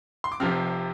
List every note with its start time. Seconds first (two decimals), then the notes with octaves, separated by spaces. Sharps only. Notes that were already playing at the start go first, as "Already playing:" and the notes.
0.24 C6
0.32 D6
0.40 F1 F2 C3 F3 C4 F6